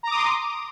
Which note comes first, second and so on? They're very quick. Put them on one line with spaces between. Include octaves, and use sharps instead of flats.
A#5 D6 D#6 C6